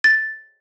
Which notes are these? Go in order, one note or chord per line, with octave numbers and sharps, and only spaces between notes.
A6